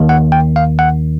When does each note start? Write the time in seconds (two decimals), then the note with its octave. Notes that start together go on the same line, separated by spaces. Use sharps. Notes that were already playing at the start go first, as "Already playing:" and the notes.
Already playing: D#2 D#3
0.09 F#5
0.32 G5
0.56 F5
0.79 F#5